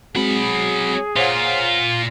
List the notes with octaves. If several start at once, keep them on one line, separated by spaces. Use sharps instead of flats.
F#3 G#3 C4 F#4 G#4 B5
A#2 F4 C5 C#5 F#5